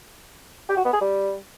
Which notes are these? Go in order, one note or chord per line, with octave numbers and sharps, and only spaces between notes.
G4
F#4
B3
G#4
G3